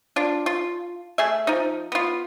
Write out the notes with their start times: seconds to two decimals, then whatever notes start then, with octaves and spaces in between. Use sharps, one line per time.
0.16 D4 F4
0.46 F4
1.18 A3 G#4 E5
1.47 F3 D#4
1.92 B3 F4